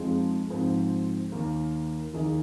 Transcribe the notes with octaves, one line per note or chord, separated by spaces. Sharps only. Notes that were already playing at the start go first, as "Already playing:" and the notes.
Already playing: F2 F3 G#3 C4 D#4
G#2 F3 G#3 C4
D#2 D#3 A#3
D#2 D#3 A#3 D#4 G#4